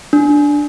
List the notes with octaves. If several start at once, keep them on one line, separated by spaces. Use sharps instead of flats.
D4